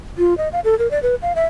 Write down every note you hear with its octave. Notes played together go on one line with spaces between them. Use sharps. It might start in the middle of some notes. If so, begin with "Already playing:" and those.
F4
D#5
F5
A4
A#4
D5
B4
F5
E5